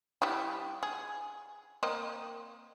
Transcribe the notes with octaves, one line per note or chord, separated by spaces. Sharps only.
G3 E4 G4
G#4
A#3 C4 D#5